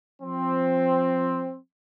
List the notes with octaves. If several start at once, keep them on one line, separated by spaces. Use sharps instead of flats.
F3 C4